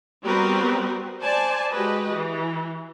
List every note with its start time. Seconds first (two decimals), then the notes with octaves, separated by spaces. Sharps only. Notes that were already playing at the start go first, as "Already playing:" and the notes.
0.25 G3 B3 C4 F#4 A#4 B4
1.21 C5 D5 G#5 A5
1.72 G#3 F#4 G4 B4 D#5
2.15 E3